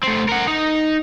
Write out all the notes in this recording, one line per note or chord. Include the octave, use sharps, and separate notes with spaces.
A3 C4
A#4 F#5
D#4